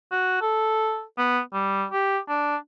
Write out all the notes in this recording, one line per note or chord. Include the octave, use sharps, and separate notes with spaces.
F#4
A4
B3
G3
G4
D4